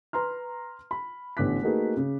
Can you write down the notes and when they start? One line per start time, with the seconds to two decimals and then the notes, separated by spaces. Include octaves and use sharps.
0.13 B4 A#5 C6 F6
0.91 B5
1.37 A1 D3 B3 D6 F#6 B6
1.62 A3 A#3 D#4 F#4 G#4 B4
1.97 C#3